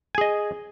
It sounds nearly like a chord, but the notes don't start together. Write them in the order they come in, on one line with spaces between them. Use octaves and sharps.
G#5 G#4 D#5